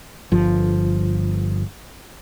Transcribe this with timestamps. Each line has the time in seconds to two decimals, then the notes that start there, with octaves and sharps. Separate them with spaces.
0.32 G1 F3